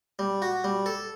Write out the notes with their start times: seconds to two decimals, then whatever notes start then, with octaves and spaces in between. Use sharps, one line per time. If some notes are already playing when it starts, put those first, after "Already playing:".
0.19 G3
0.42 F#4
0.64 G3
0.86 A4